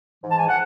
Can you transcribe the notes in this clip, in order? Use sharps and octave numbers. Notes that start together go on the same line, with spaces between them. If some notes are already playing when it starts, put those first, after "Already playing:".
G#2 E3
A5
G#5
F#5